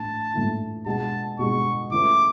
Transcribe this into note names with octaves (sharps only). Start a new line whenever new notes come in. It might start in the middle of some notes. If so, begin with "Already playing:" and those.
Already playing: A2 E3 A3 D4 A5
A2 E3 A3 D4
B2 G#3 B3 D4 G#4 A5
B2 G#3 B3 D4 G#4 C#6
E3 A3 C#4 E4 B4 D6